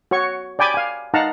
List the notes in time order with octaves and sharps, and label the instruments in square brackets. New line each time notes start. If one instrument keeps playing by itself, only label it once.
[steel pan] F#4 C#5 C#6
D5 G5 G#5 B5 D6
F5 G#5
D#4 F5 F#5 A5 A#5